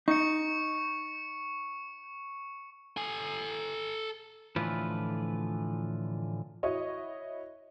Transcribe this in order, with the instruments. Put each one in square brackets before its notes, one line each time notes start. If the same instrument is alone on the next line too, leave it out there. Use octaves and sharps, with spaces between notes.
[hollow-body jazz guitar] D#4 [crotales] C#6 C#7
[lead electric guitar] A4 G#5
[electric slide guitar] A2 D3 E3 F3 F4 B4
[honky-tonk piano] E4 F#4 C#5 D#5